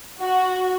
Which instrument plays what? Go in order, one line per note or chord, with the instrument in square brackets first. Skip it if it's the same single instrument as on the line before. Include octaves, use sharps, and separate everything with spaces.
[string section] F#4